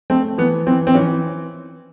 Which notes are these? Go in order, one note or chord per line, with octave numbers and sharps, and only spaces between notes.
A3 C4
E3 B3
E3 C4
C4
E3 C#4